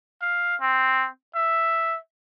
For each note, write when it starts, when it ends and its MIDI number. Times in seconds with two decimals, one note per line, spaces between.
0.22 0.56 77
0.61 1.07 60
1.35 1.98 76